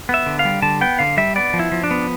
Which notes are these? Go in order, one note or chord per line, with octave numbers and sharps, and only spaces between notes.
B3 E5
D3
F5
G3
D3 A5
B3 G5
D3 F5
G3 E5
B3 D5
F3
E4
F3
D4
B3